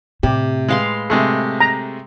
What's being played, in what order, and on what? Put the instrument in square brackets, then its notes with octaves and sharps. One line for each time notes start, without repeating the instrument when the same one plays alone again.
[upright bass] A2 [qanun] C3 [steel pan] G4
[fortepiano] G#3 [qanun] B4 F5 C6
[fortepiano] C3 G#3 A3
[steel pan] A#5